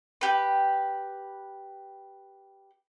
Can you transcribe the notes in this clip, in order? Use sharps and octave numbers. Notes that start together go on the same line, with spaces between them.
G4 B4